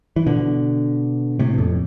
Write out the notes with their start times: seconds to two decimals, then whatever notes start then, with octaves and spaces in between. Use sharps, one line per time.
0.16 E3
0.26 B2 D3
1.39 A2 C3
1.54 B2
1.58 F2 A2